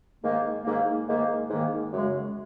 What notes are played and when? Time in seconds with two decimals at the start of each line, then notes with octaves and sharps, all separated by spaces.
0.23 G#2 D#3 A#3
0.64 G#2 D#3 A#3
1.07 G#2 D#3 A#3
1.49 G#2 D#3 A#3
1.92 F#2 C#3 G#3